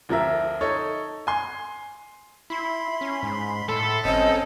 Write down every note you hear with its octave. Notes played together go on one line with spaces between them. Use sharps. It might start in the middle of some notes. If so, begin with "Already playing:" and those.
D2 F3 A#4 E5
D#4 A4 C#5
G#5 C6
E4 B5 C6
C#4
G#2
A2 A4
G1 C4 C#4 D#5